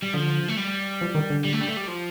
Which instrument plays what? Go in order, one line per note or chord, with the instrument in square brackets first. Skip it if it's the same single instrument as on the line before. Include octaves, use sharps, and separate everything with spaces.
[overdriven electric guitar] G3
[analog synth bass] D3 [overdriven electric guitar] F3
[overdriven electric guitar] A3
G3
[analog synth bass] F3
D#3
D3
[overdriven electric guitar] G3
A3
G3
A3
G3
F3